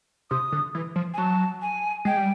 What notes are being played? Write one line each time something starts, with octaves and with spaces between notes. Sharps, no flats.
C3 D#6
D3
E3
F3
G#5
F#3 A5
G#5
G#3 G5
G3